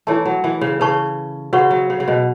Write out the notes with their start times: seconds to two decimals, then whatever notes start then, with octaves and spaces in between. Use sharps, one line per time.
0.07 E3 A3 E4 C#5 A5
0.25 F#3
0.44 E3
0.61 C#3
0.80 C#3 B4 A5 C#6
1.53 C#3 F#4 B4 F#5 C#6
1.70 F#3
1.90 C#3
2.00 C#3
2.08 B2